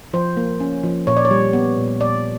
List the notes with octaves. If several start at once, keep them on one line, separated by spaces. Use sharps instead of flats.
F3 C5
A#3
C#4
F3
A#2 C#5
D5
C#5
G3
B3
A#2
A#2 D5